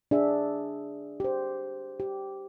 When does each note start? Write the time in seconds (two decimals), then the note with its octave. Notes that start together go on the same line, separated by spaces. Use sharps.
0.11 D4 G#4 E5
1.20 G4 C5
2.00 G4